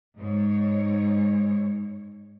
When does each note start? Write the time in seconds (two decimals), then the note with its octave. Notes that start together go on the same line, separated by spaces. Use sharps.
0.17 G#2 C#5